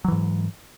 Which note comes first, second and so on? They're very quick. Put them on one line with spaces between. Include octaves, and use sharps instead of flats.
F#3 E3 G#2